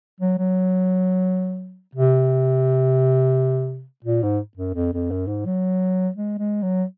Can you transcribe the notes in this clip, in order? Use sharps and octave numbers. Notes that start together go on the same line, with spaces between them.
F#3
F#3
C3
A#2
G#2
F#2
F2
F2
F#2
G#2
F#3
G#3
G#3
F#3